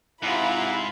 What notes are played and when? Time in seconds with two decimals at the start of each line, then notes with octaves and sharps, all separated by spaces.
0.23 G#2 C3 E4 F4 F#5 A#5 B5 D6